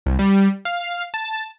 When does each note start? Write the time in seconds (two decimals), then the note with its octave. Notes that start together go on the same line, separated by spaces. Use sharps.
0.06 C2
0.19 G3
0.65 F5
1.14 A5